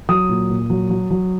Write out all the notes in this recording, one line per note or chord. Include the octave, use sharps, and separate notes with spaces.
F#3 D#6
A#2
A#2
F#3
F#3
F#3